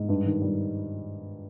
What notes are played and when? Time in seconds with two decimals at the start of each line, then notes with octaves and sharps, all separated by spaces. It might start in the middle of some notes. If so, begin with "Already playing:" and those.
Already playing: G#2
0.09 G2
0.26 D#3
0.42 G3